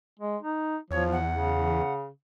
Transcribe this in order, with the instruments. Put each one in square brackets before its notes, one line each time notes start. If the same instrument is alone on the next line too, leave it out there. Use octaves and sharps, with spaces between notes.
[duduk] G#3
D#4
[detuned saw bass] E2 [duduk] F3 [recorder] C#5
[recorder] F#5
[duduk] C#3